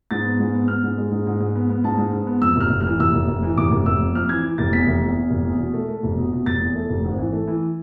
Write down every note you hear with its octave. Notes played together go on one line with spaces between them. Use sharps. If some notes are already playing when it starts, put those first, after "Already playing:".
G#2 A6
B3
G#2
B3
B3 F6
G#2
G#3
G#2
G#2
G#2
B3
B3
G#2 A5
G#2
G#2
B3
F2 E6
F1 F6
F1
F6
E3
F1 E6
F1
F1
E3
F1 D6
F1
F1 E6
F2
F2 F6
E3 G#6
E3
F1 A6
E2 B6
F1
E2
E2
F1
E2
B2
A3
A3
F1
B2
B2
F1 A6
E2
A3
F1
G#1
E3
A3
E3